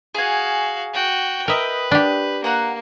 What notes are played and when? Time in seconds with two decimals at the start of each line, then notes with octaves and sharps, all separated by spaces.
0.15 F#4 G#4 F5 G#5
0.94 F#4 G5
1.48 A#4 B4 D#5 E5 G5
1.91 D4 G4
2.44 A#3 F#5 A#5 F#6